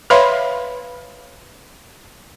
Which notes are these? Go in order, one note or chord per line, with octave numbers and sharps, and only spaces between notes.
B4 C#5 E5 F5 B5 C6